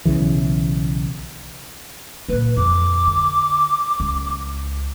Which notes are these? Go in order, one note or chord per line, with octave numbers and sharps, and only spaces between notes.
B1 C#3 E3
A#2 A#3 B4
F2 D6
D3
C#2